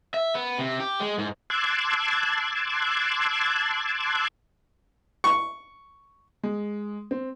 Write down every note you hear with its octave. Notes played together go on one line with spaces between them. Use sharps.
E5
B3
C3
G4
G#3
G#2
A5 C6 D6 E6 F#6 G#6
C#6
G#3
C4